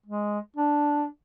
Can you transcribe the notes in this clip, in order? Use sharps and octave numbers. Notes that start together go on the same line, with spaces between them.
G#3
D4